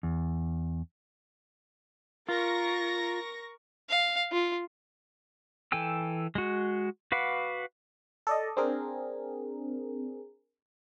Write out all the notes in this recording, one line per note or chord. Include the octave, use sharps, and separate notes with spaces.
E2
F4 A#4 C#6 A#6
F5
F4
E3 A4 G5 G#5 E6
G#3 F#4
F#4 B4 F5 F#5 D6
A4 D5 D#5
C4 D4 G#4 A#4